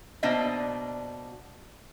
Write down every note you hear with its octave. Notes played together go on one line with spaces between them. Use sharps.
B2 A#3 D4 C5 D#5 E5